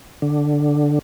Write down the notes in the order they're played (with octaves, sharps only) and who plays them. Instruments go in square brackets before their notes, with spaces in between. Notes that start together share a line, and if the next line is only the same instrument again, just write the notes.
[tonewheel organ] D3